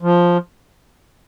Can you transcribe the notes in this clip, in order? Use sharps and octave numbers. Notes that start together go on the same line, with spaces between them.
F3